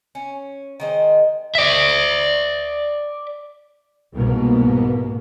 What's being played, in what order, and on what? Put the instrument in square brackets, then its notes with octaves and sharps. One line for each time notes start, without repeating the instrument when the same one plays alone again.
[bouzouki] C#4
D#3 G#3 C5
[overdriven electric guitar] D5 E5
[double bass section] C2 G#2 B2 A#3 B3